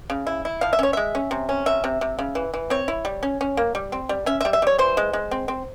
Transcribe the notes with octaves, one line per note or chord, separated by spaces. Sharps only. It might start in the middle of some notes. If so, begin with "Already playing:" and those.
C#3
E4
E4
F3 F5
E5
C#4 C#5
G#3 E5
C#4
C3
C#4
C3 E5
C3
C3
C#3
E3
E3
C4 C#5
E4
G3
C#4
C#4
A#3
G3
C4
G3
C#4 E5
E5
G3
E5
G3 C#5
E3 C5
G#3
G#3
C4
C4